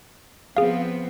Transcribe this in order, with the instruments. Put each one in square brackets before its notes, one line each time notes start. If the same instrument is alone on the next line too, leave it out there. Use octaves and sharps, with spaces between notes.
[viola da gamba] F3 B3 C4 [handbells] G#4 F5